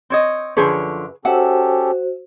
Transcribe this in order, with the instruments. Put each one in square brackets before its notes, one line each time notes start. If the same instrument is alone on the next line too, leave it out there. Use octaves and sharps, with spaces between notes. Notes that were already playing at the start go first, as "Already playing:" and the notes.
[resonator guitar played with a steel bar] C4 C#5 D#5
[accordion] F#2 [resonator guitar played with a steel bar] D3 F3 C#5 [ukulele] G#4 B4
[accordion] C#4 G4 A4 [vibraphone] F#4 C5 [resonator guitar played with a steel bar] E5 [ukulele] F#5